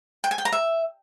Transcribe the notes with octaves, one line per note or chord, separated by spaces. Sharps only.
G5
G#5
G5
A#5
E5